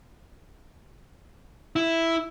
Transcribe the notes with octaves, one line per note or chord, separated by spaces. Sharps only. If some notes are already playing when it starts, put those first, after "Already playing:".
E4